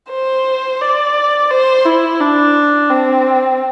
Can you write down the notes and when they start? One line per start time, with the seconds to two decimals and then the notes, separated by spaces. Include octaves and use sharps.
0.11 C5
0.81 D5
1.51 C5
1.86 E4
2.20 D4
2.90 C4